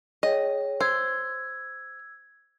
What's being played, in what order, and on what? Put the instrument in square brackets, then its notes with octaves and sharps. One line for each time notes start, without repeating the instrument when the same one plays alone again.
[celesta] G#4 C#5 G5 [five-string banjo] D#5
[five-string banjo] C5 [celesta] E6 G#6